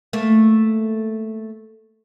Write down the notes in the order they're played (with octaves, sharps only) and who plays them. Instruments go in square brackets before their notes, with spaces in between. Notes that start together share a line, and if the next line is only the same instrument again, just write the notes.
[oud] A3 A#3